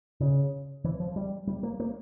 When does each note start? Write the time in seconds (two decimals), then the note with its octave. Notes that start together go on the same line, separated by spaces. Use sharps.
0.21 C#3
0.84 E3
1.00 F3
1.16 G3
1.47 G3
1.63 A#3
1.80 A#3